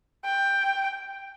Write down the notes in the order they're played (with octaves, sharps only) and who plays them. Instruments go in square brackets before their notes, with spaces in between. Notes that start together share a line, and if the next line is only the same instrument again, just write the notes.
[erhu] G5